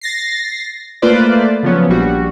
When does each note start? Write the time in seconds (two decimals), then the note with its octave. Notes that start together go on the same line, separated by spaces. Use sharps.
0.01 A6 A#6 C7
1.02 A3 A#3 F4 B4 C5 D5
1.63 C#3 F3 F#3 B3 C#4
1.89 A#1 G3 F#4